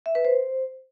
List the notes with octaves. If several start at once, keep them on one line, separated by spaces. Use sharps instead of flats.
E5
B4
C5